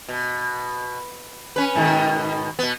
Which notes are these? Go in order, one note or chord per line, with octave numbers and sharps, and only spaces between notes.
B2
C#4 B4
G#2 B2 D#3
B2 B3